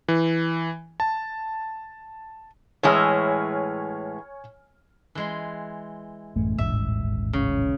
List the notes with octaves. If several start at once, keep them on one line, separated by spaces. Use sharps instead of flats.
E3
A5
A2 E3 G#3 C#5 G#5 F6
E3 G#3 C6
A1 F#2 A3
D#1 A1 G#2 E5
C#3